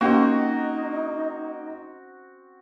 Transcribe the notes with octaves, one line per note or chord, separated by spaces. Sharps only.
A#3 C4 C#4 D#4 F#4 G4